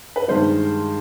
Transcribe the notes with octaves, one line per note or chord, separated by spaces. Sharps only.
B4
G2 D#3 G#3 C5